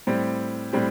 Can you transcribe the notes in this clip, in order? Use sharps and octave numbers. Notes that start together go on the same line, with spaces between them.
A2 G3 C4 G4
A2 G3 C4 G4